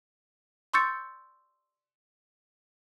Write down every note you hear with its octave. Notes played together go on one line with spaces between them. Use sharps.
C6 C#6 E6 G6 A6 C#7